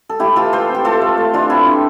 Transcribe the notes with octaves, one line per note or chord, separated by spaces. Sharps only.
A4
A3 E4 G4
E3 F4 A4
E3 A4 C5
C4
G4
A3 F4 A4
A3
A3
E3 D4 F4
C4 E4
C4